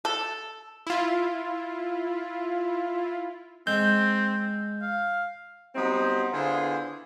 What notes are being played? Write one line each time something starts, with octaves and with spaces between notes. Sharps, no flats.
A4
E4 F4
G#3 C4 G6
F5
F#3 G3 B3 C4 D#4 C5
D3 B3 E4 F4 G#4 C5